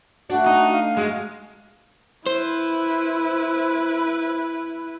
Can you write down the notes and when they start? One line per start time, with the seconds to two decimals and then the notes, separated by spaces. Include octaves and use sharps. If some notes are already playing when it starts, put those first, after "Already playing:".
0.30 A3 D4 F#4
0.46 D#4
0.72 F5
0.97 G#3 D#4 F#4 G#4
2.26 E4 B4 C5